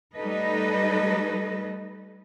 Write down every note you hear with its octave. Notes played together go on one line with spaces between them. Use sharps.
G3 A3 D#4 A4 B4 D#5